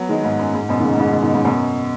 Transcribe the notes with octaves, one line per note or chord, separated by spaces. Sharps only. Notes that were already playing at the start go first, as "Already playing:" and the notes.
Already playing: F#3 B3
D#3 G#3
G#2
F#2
G#2
F#2 B2
D#3
G#2 C#3
B2
G#2 C#3
B2 D#3
B2 D#3
G#2 C#3
F#2 B2